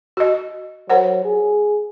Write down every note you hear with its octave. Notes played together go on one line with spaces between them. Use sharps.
F#4 D#5
F#3 A#4 C5 F#5
G#4